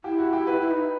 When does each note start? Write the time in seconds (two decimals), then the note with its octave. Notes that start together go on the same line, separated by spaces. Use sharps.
0.04 E4 G4
0.19 F#4
0.33 G4
0.47 B4
0.61 E4
0.71 D#4